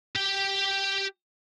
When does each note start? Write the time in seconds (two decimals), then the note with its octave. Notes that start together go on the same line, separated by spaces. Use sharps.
0.16 G4 G5